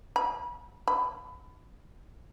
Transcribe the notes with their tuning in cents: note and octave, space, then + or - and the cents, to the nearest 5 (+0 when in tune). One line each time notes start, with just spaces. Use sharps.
B5 -30
B5 +25